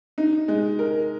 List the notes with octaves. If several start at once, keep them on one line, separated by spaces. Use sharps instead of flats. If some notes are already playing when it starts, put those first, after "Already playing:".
D#4
G#3
A#4